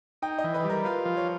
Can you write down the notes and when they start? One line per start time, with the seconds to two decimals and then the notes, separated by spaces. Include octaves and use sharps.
0.22 D#4 G5
0.39 D#5
0.44 E3
0.54 B4
0.64 G3
0.70 A#4
0.85 F4 B4
1.05 F3
1.17 C#5